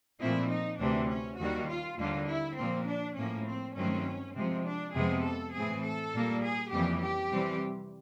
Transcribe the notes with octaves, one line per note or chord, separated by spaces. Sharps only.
A#2 F3 A3 C4 E4
D#4
D2 C3 E3 D4
C#4
D#2 D#3 G3 A#3 F#4
F4
D#2 D3 G3 A#3 F4
E4
A#2 F3 A#3 C4
D4
A2 F3 A#3 C#4
C4
G2 D#3 F#3 A3 C4 C#4
C3 F3 G#3 C4
D4
F2 C3 F3 G#3 B3 G#4
A4
A2 E3 A3 C4 G#4
A4
A#2 G3 A#3
G#4
F2 C#3 E3 G3 A#3 G4
G4
C3 E3 G3 C4